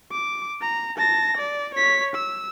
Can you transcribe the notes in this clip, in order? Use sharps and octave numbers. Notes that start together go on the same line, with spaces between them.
D6
A#5
A5 A#6
D5
C#5 B6
E6